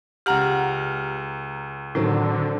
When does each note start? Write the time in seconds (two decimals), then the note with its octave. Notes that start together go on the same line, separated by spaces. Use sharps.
0.26 C#2 G4 F#5 A#5 F6
1.95 A2 D3 D#3 F#3 C4